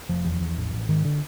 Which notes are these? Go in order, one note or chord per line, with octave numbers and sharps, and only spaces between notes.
F1 F3
E2
E2
A1
A1
G#2 D#3
D3